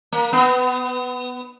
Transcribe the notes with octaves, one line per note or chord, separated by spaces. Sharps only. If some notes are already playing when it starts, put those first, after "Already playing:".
A#3
B3